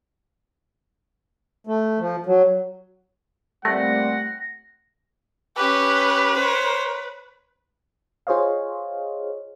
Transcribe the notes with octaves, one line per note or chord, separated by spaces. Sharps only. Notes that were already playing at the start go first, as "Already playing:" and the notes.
A3
F3
F#3
A#2 G3 A3 C4 F#5 A#6
C#4 G4 B4
C5 C#5
F4 G#4 C5 C#5 D#5 F5